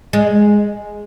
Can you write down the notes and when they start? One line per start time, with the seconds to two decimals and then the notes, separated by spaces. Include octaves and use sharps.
0.13 G#3